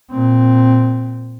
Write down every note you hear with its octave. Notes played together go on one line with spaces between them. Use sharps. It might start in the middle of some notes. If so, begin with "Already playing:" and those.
A#2 C4